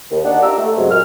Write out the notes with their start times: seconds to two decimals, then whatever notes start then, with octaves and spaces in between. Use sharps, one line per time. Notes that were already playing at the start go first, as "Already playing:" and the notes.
0.10 D#2
0.24 D4 D#4 F#5
0.41 A#3 D4 F4 G4 A#5 E6
0.57 A3
0.76 F#2 C3 F#3 G#3
0.91 A#2 F6